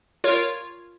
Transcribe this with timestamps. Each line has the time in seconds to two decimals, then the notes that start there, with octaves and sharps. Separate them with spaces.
0.24 F4 A#4 C#5